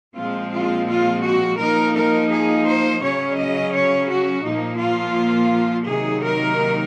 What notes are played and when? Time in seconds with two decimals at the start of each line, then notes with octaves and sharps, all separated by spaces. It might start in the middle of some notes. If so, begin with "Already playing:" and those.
0.15 A#2 F3 G#3 C4 F4
0.51 F4
0.87 F4
1.23 F#4
1.59 F3 A#3 D#4 A#4
1.95 A#4
2.31 G#4
2.66 C5
3.02 C#3 F#3 C#4 C#5
3.37 D#5
3.73 C#5
4.09 F#4
4.44 A#2 F3 A#3 D#4
4.80 F4
5.88 C3 D#3 F#3 A#3 D#4 G#4
6.25 A#4